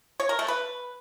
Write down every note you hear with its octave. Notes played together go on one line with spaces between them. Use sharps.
C#5
A#4
A3
B4